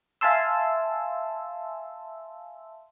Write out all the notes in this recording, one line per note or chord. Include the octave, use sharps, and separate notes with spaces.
E5 F5 G#5 A5 C6 E6